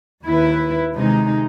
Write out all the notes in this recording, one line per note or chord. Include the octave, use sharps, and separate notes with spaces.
D#2 E4 B4
C3 D#3 G#3 D#4